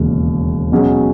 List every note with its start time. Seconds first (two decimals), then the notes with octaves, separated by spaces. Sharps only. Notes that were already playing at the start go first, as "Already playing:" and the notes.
Already playing: E1 D#2 C#3
0.72 B2 F#3 C#4 G#4